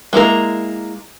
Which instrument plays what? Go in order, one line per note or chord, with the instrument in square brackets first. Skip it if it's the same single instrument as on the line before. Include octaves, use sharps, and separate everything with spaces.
[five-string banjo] G#3 A#3 E4 A#4